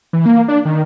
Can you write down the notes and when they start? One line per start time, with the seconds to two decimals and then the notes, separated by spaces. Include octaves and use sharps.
0.13 E3
0.26 A#3
0.48 D4
0.65 D#3